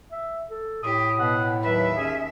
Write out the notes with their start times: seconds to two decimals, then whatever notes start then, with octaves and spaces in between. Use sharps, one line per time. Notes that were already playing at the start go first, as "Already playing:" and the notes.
0.12 E5
0.51 A4
0.83 A2 G4 D#6
1.19 B2 F#5
1.63 D#2 F#3 B4 E5
1.97 C#4 G#4